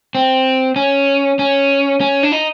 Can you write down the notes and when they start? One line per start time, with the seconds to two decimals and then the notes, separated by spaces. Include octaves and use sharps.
0.15 C4
0.76 C#4
1.39 C#4
2.01 C#4
2.23 D4
2.32 D#4